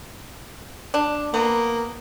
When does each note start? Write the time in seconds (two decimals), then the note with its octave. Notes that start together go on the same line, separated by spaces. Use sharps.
0.94 D4
1.34 A#3 B3